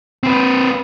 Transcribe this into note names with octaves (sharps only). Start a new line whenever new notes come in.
C4 B4